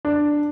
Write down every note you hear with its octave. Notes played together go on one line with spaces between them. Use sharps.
D4